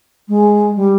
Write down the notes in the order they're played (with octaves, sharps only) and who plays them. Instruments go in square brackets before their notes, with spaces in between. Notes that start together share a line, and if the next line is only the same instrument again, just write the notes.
[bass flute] G#3
G3